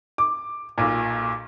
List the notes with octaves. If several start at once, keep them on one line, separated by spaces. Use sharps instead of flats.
D6
B1 A#2